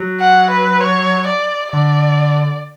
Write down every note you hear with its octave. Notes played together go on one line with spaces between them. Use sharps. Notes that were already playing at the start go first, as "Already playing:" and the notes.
Already playing: F#3
F#5
B4
C#5
D5
D3 D5